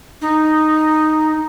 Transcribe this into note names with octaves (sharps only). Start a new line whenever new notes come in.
D#4